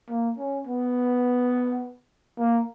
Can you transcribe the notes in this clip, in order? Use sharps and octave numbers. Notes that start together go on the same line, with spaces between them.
A#3
C#4
B3
A#3